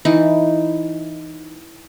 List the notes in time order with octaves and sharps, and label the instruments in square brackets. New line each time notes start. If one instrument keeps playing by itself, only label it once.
[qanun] E3 D#4